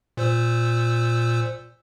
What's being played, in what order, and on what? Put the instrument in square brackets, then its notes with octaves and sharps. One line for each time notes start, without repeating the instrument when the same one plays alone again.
[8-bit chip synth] A#2 C5 E6